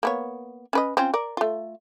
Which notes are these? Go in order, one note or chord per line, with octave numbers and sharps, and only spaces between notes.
A#3 B3 C#5
C#4 B4 D#5
C4 C#4 F4
A#4 D5
A3 F4